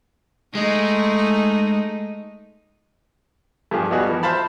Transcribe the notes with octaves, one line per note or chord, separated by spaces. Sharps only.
G#3 A3 D#4
G2 F3 G4 G#4
G3 B3 D#4 F#4 G#4
E3 F3
C5 E5 F5 A5 B5